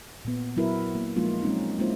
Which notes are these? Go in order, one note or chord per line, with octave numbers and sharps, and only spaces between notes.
A#2 B3
F#3 B3 E4 F#4 A#4 B4
A#3
F3 G#3 A#3 D#4 F4
F#3 G#3 C4 C#4 D#4
G#3 A#3 C#4 E4 F4 C5